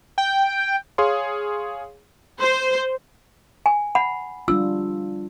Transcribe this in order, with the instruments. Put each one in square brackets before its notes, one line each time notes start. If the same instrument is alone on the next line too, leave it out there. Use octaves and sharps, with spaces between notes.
[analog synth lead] G5
[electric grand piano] G#4 C#5 F5 C6
[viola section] C5
[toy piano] G#5
F#5 B5
[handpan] G3 D4 F4 [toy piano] E6